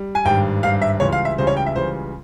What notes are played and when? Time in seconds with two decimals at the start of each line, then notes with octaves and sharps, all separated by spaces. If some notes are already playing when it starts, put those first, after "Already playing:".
Already playing: G3
0.15 G#5
0.25 G#1 G2 G3 G5
0.63 G#1 G2 G3 F5
0.82 E5
1.00 C#2 C#3 E3 G3 C#5
1.12 F5
1.25 E5
1.38 C#2 C#3 E3 G3 C5
1.47 C#5
1.57 G5
1.66 E5
1.76 C#2 C#3 E3 G3 C5